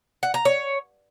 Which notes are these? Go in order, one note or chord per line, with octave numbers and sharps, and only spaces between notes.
F#5
A#5
C#5